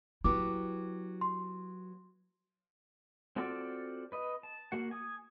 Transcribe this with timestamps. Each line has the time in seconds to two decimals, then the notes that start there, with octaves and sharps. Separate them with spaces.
0.24 F#3 B3 E4 G4 D6
1.21 C6
3.36 C4 F4 F#4 A4 D5
4.12 B4 D#5
4.43 A5
4.72 A#3 F#4 F#5
4.91 G#5 D#6